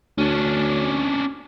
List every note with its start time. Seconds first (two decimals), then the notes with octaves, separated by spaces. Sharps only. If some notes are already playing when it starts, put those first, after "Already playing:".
0.18 D2 C#4 D4